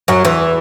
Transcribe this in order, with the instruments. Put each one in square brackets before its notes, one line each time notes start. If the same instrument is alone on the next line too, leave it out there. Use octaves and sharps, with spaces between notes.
[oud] F#2 F#3
E2 E3